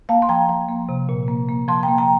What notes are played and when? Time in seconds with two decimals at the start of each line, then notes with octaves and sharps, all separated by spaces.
0.09 A#3 F5 A5
0.22 C6
0.29 F3 G5 A#5
0.49 F3
0.69 A#3
0.89 C3
1.09 A#2
1.28 A#3
1.49 A#3
1.68 F3 A5 C6
1.83 G5 A#5
1.88 A#3
1.98 G5 A#5